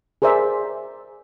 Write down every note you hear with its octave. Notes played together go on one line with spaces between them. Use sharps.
G#4 A#4 C5 D5 E5